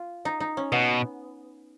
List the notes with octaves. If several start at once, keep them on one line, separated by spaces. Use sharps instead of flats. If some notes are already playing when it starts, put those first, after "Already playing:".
Already playing: F4
D#4
D#4
C#4
B2 B3